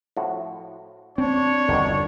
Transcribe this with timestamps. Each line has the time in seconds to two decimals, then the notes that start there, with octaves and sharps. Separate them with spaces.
0.17 A2 F3 F#4
1.18 C4 D4 C#5
1.68 G1 E2 B2 D3 D#3